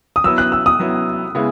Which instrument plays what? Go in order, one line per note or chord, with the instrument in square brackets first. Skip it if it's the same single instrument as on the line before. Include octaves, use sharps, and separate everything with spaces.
[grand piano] D#6
[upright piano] F#3 B3 E4 [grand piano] E6
[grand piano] F#6
E6
D#6
[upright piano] F#3 B3 E4
C#3 G#3 B3 E4